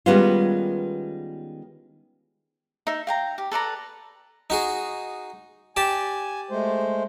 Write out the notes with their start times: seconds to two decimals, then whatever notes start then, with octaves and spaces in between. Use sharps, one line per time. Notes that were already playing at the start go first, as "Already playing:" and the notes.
0.06 D#3 G3 G#3 B3 C#4 F4
2.87 D#4 E5
3.07 F5 G5 A#5
3.38 G4
3.51 A4 B4 D5 A#5
4.50 D#4 F#4 G#4
5.77 G4 D5 G#5 A5
6.51 G#3 A3 C5